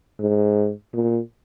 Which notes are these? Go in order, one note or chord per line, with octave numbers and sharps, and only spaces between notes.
G#2
A#2